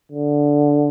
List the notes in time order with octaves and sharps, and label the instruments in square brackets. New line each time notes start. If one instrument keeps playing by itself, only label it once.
[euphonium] D3